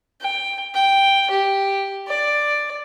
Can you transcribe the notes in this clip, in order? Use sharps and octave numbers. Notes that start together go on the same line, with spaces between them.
G5
G5
G4
D5